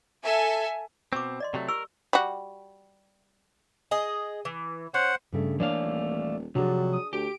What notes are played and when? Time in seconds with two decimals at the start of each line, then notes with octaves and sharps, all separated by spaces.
0.23 A4 E5 G#5
1.13 B2 C4 C#6 D6
1.40 D5 D#5 C6
1.54 C3 F#3 A3
1.69 G4 A#4 C#6 E6
2.13 G3 F#4
3.91 G#4 D#5
4.45 E3
4.94 C#4 C5 F#5
5.33 G2 C#3 A3
5.60 E3 A3 A#3 D4 C#5 D5 F5
5.81 D#1
6.55 C3 F3 F#3 D4 F#4 G#4
6.93 D#6
7.13 D2 G4 D7